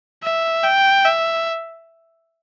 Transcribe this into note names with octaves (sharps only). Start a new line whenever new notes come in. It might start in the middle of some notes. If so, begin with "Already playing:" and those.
E5
G5
E5